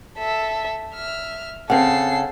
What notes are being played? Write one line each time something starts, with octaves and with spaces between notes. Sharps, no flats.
A4 E5
E5 F6
C#3 C4 A4 F#5 C7